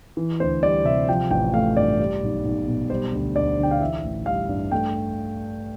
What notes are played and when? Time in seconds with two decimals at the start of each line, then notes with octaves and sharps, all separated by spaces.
0.17 E3
0.40 D2 C5
0.63 G3 D5
0.85 C3 E5
1.09 F3 G5
1.31 A1 G5
1.54 A3 F5
1.77 G2 D5
1.99 G3
2.23 B1
2.45 B1
2.67 B2
2.90 G3 C5
3.13 D2
3.35 D2 D5
3.58 D3
3.63 G5
3.71 F5
3.81 E3 E5
4.04 A1
4.26 G3 F5
4.49 G2
4.71 A3 G5